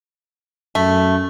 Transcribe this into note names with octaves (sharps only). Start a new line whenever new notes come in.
F#2 A3